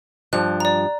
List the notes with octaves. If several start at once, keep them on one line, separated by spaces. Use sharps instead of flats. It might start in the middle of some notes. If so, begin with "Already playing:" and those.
G2 F3 F#6
D5 A#5